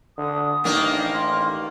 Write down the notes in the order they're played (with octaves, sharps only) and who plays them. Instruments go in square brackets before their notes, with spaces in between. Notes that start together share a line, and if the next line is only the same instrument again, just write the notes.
[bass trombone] D3 [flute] D#6
[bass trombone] A1 [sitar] D#3 A#3 D4
[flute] C6